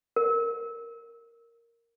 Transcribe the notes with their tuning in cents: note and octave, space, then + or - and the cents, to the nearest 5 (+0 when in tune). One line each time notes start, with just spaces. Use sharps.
A#4 -5